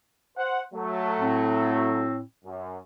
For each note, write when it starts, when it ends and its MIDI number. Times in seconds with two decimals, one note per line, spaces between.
0.37 0.60 72
0.37 0.60 78
0.74 2.11 54
0.74 2.11 57
1.20 2.21 45
1.20 2.21 60
2.45 2.77 42